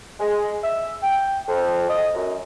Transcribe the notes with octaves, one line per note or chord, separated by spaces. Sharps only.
G#3
E5
G5
F2
D#5
F#2